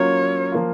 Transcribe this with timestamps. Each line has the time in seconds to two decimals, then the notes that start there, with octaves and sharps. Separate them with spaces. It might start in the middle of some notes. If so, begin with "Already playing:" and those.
Already playing: F#3 A#3 C#4 F4 C#5
0.52 F3 A#3 F4